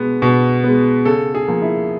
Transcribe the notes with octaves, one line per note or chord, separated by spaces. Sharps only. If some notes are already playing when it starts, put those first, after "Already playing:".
Already playing: B2 G#3 B3
B2
G#3 B3
C#3 A4
G#4
F3 A#3
E4